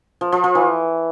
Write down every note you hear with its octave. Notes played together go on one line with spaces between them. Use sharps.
F3
F3
F3
E3